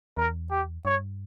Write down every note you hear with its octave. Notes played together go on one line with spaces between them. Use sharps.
E2 A#4
G4
G2 C#5